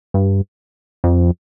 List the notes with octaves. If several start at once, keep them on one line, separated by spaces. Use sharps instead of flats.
G2
F2